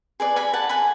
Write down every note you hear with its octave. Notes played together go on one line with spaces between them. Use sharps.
G#4 B4 D5
G#5 B5
F#5 A5
G#5 B5